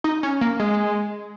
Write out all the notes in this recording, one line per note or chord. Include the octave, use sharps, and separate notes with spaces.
D#4
C#4
A#3
G#3